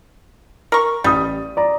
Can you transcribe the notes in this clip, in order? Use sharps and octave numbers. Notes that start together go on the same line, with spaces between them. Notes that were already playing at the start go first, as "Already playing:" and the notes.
A#4 C#6
A1 G3 D#6
D5 A#5